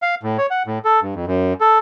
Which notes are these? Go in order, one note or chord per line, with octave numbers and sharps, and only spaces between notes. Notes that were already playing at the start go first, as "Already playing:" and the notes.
F5
A2
C#5
F#5
A2
A4
G2
F2
F#2
A4